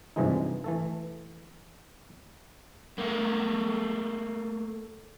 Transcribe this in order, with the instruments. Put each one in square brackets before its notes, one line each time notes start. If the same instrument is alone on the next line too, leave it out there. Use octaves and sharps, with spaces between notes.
[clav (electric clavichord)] G2 C3 E3 F3 G#3 D#4
E3 A3 A4
[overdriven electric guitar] A3 A#3